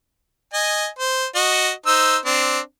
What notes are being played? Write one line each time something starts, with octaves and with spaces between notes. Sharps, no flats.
D#5 G#5
C5
F#4 D#5
D#4 C5 E6
C4 D4